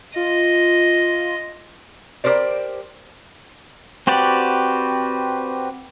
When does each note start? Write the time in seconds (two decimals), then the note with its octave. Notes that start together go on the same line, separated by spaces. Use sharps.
0.16 F4 D#5
2.24 G4 A4 A#4 C5 D5
4.07 C4 F#4 G4 B4 D5